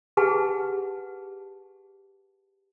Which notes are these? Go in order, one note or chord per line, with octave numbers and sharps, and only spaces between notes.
G4 G#4 B4 F#5 A5